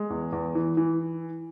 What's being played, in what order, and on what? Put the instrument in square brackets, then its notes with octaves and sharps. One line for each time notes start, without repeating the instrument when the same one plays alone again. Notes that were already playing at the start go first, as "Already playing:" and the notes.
Already playing: [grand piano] G#3
E2
E2
E3
E3